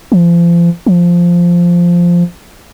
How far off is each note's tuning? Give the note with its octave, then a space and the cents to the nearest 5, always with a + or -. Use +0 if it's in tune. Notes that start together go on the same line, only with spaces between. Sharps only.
F3 -35
F3 -5